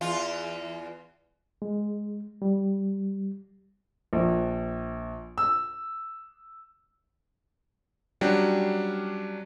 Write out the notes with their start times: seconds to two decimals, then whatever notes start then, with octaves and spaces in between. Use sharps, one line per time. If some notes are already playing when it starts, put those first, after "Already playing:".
0.01 E2 F4
1.62 G#3
2.42 G3
4.13 A#1
5.38 E6
8.21 F#3 G3 C#4 D4 F#4 G4